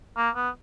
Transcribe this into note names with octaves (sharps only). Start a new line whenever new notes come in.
A#3
B3